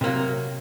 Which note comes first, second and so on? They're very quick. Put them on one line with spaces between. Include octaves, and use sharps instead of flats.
C3 A#3 F#3